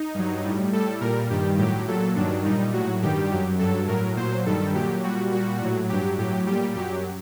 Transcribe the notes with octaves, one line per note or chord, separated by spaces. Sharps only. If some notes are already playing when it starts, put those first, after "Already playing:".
Already playing: D#4
G2 F#3
A2 G3
A2 G3 A4
A#2 G3 A#4
G2 D#3 G3 G4
A2 F#3 G4
A#2 F#3 A4
G2 D#3 F#3 D4
A#2 G3 D#4
A2 F#3 F#4
G2 D#3 G3 G4
F#2 F#3
G2 F#3 A4
A2 F#3 A#4
A#2 F#3 C5
G2 D#3 G3 A4
A#2 F#3 G4
A#2 G3 F#4
A#2 G3 F#4
A2 F#3
G2 F#3 G4
A2 F#3 G4
A#2 G3 G4
F#2 F#3 G4